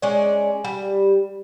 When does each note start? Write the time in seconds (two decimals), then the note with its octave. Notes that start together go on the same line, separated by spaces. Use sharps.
0.02 G#3 C#4 D5
0.65 G3